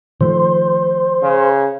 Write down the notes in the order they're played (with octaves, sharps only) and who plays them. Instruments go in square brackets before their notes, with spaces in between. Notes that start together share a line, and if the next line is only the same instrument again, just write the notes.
[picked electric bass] D#3 F3 A3 [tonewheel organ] C5
[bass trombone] C#3